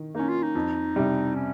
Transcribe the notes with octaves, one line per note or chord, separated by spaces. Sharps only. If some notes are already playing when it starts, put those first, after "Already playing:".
Already playing: D#3
A#3 C#4 D#4
F4
D#4
F2
C3 G3
C#4